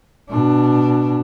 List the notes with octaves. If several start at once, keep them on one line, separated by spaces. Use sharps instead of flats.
B2 D4